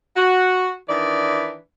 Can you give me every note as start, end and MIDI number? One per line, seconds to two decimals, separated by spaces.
0.17 0.74 66
0.88 1.56 51
0.88 1.56 52
0.88 1.56 62
0.88 1.56 74